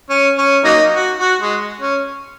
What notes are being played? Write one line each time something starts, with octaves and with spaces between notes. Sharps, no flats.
C#4
C#4
F#3 A#3 D#4
F#4
F#4
G#3
C#4